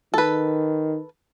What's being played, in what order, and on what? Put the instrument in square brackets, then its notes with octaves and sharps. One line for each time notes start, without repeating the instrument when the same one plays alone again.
[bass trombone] D#3 [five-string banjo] A4 B4